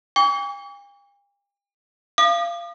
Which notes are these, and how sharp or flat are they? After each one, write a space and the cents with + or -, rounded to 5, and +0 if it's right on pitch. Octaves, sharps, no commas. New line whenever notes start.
G5 +45 C#6 +45
F5 -25 D#6 -45